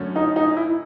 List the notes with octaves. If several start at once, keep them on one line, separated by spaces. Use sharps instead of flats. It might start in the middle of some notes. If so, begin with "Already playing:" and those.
Already playing: F#2 D3 F#3 A3 C#4
D#4
D#4
E4